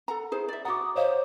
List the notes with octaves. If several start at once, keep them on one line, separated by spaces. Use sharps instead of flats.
A4 F#5 A#5
E4 G#4 C5
D5 E5
F#4 F#5 A#5 D6 D#6
C5 C#5 D#5 F5